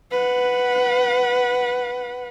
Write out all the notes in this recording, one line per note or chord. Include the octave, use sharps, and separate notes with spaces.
B4 F#5